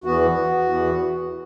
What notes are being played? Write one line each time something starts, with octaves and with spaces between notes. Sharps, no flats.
E2 E3 B3 F#4
E2 E3 B3